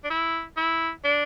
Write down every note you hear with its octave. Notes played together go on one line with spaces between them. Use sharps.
D4
E4
E4
D4